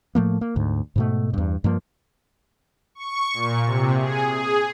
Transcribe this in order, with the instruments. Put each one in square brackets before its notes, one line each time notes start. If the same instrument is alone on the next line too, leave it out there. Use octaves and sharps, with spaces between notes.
[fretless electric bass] A2 F3 A3 A#3
A#3
D2 G#2
G#2 B2 A3
E2 G2
G2 F3 A#3
[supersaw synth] C#6
A#2
C3
G#4
G#4